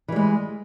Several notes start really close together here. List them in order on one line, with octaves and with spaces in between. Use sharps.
E3 G3 G#3